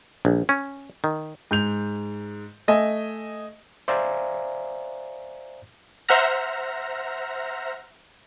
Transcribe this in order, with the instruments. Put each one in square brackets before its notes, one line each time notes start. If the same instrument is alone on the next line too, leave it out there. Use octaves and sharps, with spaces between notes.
[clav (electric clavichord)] A#1
C#4
D#3
[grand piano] G#2 G6 F7
A3 D#5 E5 G#5
[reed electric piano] C5 D5 E5 F5 G#5 A#5
[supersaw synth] C5 E5 F#5 A#5 F6 A#6